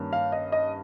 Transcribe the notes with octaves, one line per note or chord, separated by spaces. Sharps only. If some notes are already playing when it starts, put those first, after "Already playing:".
Already playing: G2 D#3 A#3 C#4
F5
D#5
D#5